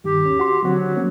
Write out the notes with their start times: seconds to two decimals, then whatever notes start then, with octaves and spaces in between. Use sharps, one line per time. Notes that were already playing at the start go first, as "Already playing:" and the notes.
0.04 G2 D#3 G4
0.25 D#2 C#4
0.40 F#4 C6
0.64 D3 F#3 C4 F#4
0.97 A#3 C#4